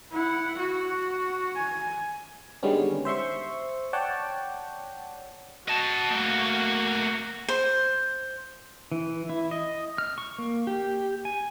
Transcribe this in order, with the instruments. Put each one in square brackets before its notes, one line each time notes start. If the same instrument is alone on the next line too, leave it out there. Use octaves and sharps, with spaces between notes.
[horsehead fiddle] E4 F#5
F#4
G#5
[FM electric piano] D3 D#3 G3 G#3 B3 C#4
C5 E5 C6 C#6
C#5 D5 F#5 G5 A5
[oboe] F#4 [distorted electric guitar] D#5 A5
[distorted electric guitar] A3 A#3
[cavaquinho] C5
[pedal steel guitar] E3
E4
D#5
F6
C#6
A#3
G4
G#5